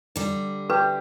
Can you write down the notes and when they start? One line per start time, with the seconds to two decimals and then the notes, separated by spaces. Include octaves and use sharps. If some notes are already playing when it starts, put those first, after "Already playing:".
0.16 D3 G3
0.70 G4 B4